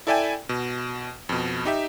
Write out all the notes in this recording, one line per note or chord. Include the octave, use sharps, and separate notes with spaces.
E4 A4 D5 E5 G5 G#5
B2
F2 B2
D#4 G4 E5